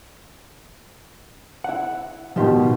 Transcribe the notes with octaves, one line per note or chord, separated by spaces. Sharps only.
E4 F#5
B2 D#3 F3 F4 G4